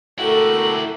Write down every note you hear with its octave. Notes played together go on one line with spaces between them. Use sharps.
A3 E4 F#4 G4 A4 A#4 F#7